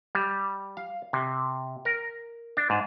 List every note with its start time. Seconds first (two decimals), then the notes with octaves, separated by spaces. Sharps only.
0.15 G3
0.77 F5
1.13 C3
1.85 A#4
2.57 D4
2.70 G#2